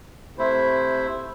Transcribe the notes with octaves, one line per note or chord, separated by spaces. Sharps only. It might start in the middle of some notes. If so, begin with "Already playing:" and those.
C3 A3 E4 C5 E5